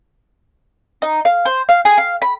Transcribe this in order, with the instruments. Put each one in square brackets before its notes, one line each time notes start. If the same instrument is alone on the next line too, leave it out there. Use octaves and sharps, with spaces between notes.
[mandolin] D#4
F5
C5
F5
G#4
F5
B5